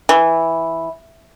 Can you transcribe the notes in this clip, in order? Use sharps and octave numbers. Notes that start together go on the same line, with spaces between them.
E3